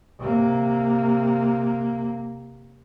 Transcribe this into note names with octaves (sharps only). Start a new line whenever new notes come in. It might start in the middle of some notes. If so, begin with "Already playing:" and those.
C3 A#3